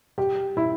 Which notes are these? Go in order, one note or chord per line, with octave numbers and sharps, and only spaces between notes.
G4
E4